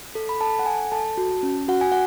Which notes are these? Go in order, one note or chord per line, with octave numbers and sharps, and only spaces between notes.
A4
B5
A4 A5
F#5
A4 G#5
A4 A5
F#4
C#4
F#4 F#5
G#5
F#5